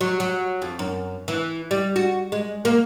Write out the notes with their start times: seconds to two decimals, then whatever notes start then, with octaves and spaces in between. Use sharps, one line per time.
0.01 F#3
0.20 F#3
0.62 F2
0.79 F#2
1.28 E3
1.71 G3
1.96 F#4
2.32 G#3
2.65 A#3